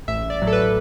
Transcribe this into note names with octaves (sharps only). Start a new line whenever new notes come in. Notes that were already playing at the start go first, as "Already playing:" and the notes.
A1 E5
D5
A2 F#3
A4
B4